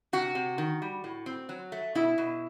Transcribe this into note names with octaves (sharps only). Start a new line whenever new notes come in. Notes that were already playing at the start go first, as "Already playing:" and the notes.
C3 F#4
C3
D#3
G3
A2
C4
F#3
A3
B2 E4
B2